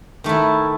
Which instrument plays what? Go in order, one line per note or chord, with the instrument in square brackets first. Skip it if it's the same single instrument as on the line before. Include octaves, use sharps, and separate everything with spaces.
[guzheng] D#3 A3 E4